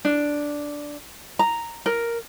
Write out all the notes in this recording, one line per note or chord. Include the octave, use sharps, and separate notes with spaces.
D4
A#5
A#4